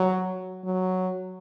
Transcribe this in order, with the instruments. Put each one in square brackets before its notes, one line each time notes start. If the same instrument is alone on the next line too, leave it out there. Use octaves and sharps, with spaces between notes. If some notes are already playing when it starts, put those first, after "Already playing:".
Already playing: [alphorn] F#3
F#3